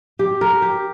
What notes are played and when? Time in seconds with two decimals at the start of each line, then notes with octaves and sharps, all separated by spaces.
0.19 G4
0.41 A#4
0.62 G4